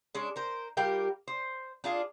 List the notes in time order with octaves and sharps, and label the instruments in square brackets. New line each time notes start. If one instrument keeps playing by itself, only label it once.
[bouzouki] G#3 C#4 D4
A#4 C5
G3 F4 G4 A#4
C5
D4 F4 G#4